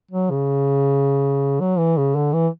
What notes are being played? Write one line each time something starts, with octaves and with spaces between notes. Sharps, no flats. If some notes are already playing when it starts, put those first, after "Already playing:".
F#3
C#3
F#3
E3
C#3
D3
E3